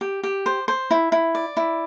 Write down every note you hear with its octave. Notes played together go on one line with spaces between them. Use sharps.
G4
G4
C5
C5
E4
E4
D5
E4